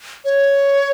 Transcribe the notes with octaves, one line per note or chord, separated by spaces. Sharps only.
C#5